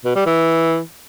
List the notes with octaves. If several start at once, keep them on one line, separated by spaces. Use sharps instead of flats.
B2
G3
E3